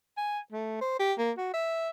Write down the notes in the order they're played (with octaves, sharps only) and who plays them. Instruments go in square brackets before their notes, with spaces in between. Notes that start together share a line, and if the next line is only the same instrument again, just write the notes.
[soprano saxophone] G#5
A3
C5
G4
A#3
F#4
E5